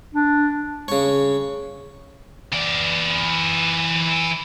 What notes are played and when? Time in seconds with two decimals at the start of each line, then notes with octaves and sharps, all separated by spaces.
0.14 D4
0.88 C#3 C#5
2.53 E3 D5